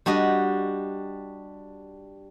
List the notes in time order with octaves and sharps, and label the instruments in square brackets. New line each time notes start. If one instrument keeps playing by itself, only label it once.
[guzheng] G3 D4 F#4 G4 D#5